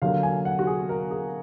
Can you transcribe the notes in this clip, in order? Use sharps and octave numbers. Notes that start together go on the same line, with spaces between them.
D3 F#3 A#3 F5
G#5
F#5
F#4
G#4
A#4
G#4